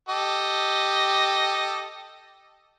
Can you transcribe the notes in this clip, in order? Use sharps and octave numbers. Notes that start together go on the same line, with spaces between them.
G4 A4 D#5